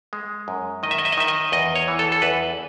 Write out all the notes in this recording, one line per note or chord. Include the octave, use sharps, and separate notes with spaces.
G#3
F#2
D#3 D#5
E5
D#5
E5
D#5
D#3 E5
D#5
E2 D#5
C#5
E3
A4
A4
E2 B4